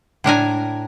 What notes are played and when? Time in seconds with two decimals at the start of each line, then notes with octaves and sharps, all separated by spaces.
0.24 A2 D4 A#4 G#5